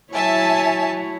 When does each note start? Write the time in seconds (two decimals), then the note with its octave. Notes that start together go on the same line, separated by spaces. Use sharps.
0.13 F#3 E4 C#5 E5 G#5 A5